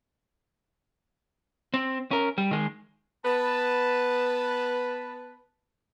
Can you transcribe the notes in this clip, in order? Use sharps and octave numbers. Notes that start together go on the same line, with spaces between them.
C4
C#4 A#4
G3
D#3 G#3
B3 B4 A5